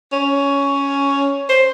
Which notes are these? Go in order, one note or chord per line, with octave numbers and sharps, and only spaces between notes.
C#4
C5